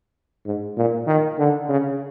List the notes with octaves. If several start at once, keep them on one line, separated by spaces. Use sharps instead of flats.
G#2
A#2
D#3
D3
C#3